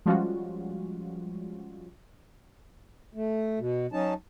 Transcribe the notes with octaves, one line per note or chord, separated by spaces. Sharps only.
F3 G3 G#3 C#4 F4 F#4
A3
B2
F#3 C#4 D#4 A5